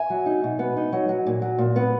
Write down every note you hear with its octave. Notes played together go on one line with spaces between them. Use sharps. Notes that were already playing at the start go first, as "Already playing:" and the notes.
Already playing: E5 G#5
F#3
D#4
B2
B3
D#4
F#3
F#3
A#2
F#3
A#2
B3